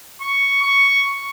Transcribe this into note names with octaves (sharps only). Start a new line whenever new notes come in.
C#6
C#6